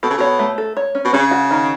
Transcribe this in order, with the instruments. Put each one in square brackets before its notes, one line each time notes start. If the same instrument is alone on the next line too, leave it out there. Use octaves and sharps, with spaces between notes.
[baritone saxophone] B2 [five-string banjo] A4
[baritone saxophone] C#3
[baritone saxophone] B2 [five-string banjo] C#5
[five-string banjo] A3
A4
C#5
C#4
[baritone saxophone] B2
[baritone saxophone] C#3 [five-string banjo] C#4
[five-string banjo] F#4
D#3